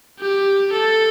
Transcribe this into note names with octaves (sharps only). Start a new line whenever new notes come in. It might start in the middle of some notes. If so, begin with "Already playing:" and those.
G4
A4